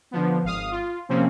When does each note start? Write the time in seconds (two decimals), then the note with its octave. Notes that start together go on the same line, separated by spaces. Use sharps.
0.11 D3 F3 B3
0.44 G#1 F5 D#6
0.71 F4
1.09 C3 F3 A#3 C4 C#4